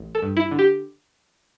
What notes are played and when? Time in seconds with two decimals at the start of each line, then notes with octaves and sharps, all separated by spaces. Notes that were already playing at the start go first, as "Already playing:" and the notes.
Already playing: A1
0.15 A4
0.22 G2
0.37 E4
0.51 D3
0.59 G4